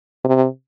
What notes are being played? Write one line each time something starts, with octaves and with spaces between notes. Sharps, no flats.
C3